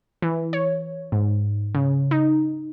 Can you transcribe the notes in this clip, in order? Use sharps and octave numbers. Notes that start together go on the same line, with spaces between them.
E3
C#5
G#2
C#3
D#4